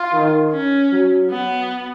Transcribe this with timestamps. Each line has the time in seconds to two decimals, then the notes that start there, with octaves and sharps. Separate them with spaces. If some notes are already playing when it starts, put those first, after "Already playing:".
Already playing: F4
0.13 D#3
0.52 C#4
0.92 F#3
1.31 F#3 B3